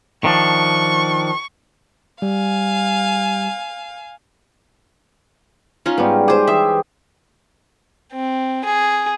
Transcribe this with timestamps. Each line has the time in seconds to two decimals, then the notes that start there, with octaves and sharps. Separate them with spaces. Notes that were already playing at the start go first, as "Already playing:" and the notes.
0.24 D#3 F3 D4 C#6
2.22 G3 F5 G#5
5.86 C#4 D#4 F4
5.98 G#2 G3 B3
6.28 G4 G#4 C5
6.48 E3 G4 G#4 E5
8.13 C4
8.64 G#4